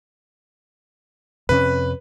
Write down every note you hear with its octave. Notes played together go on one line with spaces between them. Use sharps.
F2 C3 C#4 B4